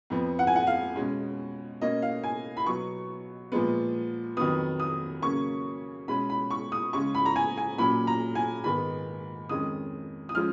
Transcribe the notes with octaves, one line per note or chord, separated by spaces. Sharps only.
F2 F3 B3
F#5
G#5
F#5
F5
B2 G#3 C#4
B2 A#3 C#4 D#5
F5
G#5
B5
B2 F#3 B3 C#6
A#2 F3 G#3 B3
F2 D#3 F#3 B3 D#6
D#6
C#3 F#3 A#3 C#4 C#6
B2 G#3 C#4 B5
B5
C#6
D#6
C#3 G#3 C#4 C#6
B5
A#5
G#5
G#5
A#2 F#3 C#4 B5
A#5
G#5
G#2 D#3 G#3 B3 B5
F2 D#3 G#3 C#4 D#6
D#6
F3 G#3 C#4 F6